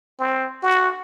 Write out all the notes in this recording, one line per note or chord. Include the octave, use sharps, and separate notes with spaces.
C4
F#4